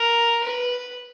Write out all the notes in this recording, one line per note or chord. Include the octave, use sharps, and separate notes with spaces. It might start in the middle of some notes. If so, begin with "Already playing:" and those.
Already playing: A#4
B4